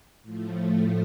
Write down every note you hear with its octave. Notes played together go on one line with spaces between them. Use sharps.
A2 F3 A3